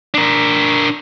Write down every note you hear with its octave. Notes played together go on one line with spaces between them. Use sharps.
D4 A#4